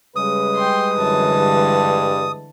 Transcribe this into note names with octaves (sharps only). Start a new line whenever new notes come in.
C#3 G3 G#3 B4 D#6
G5 C6
F#2 D3 E3 A5
G2